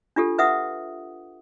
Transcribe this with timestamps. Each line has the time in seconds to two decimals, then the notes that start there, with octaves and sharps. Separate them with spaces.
0.16 D4 F4 G4 A4
0.38 B4 E5 F#5 D#6